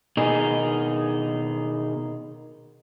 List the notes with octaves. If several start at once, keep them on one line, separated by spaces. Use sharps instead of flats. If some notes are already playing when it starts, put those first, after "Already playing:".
B2 D#3 D#4 G#4